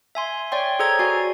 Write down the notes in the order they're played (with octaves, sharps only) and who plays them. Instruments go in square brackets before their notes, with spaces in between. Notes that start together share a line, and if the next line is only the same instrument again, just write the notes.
[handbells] E5 G#5 C6
C#5 D5 G5 C6
G#4 A4 C5 A#5 G#6
F#4 D5 G#5